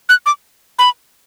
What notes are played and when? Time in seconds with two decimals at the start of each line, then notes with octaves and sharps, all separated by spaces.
0.09 F#6
0.26 D6
0.79 B5